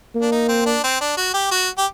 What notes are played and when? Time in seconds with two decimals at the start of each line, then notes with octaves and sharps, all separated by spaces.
0.15 A#3
0.21 D4
0.32 D#4
0.48 C4
0.66 D4
0.84 C4
1.01 D4
1.17 F#4
1.34 G4
1.51 F#4
1.78 G4